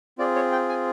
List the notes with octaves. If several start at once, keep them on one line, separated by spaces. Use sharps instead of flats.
C4 F4 G#4 D5
C#5
G5
G#5